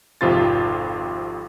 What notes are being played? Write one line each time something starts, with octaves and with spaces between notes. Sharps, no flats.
G#1 F2 C3 F4 C6 A6